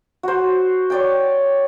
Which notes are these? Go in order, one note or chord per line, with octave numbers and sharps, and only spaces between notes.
F#4 C5
C#5 D5 G5